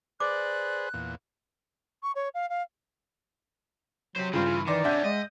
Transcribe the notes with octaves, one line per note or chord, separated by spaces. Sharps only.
G#4 B4 C5 D5 D6 F#6
E2 A#2
C#6
C#5
F5
F5
F#3 G4 C5
G2 C#3 C4 F4 G#4
E3
D#3 E3 D5 C6 D6 A#6
C3 C#4 D4 E5 F#5 G6
G#3 D#5